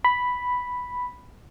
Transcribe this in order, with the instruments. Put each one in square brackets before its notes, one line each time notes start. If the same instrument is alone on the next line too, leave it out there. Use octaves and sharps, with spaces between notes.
[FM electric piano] B5